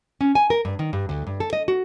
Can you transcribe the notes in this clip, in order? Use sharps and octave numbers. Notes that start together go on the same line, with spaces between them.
C#4
G#5
A#4
G2
D#3
G2
D2
G2
A4
D#5
F#4